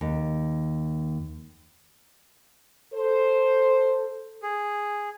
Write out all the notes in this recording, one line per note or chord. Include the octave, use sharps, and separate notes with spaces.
D#2
A4 C5
G#4